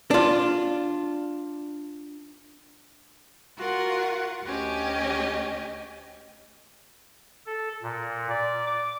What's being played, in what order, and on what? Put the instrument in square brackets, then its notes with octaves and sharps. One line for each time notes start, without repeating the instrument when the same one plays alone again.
[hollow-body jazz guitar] D4 F4
[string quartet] F4 F#4 A#4 F#5
D2 C#4 G4 D#5
[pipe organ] A4
A#2
D5
D6